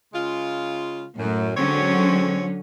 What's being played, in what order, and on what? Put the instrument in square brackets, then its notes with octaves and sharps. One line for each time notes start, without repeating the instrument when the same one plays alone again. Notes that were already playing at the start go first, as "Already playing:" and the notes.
[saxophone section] C#3 G#3 F4
[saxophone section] F#2 [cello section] A2
[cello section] D3 F#3 C#4 [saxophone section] G#3 C4 C#5